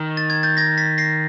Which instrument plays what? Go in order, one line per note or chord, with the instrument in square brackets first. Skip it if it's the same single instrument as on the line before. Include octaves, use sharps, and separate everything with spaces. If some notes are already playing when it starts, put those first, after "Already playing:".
Already playing: [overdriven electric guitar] D#3
[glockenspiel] A6
G#6
G6 A6
G#6 A#6
A6 B6
A#6 C7